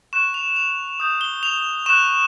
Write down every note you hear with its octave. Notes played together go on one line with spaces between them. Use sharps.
C#6 F#6 E7
F7
F7
D#6 G6
G7
F7
C#6 F#6 E7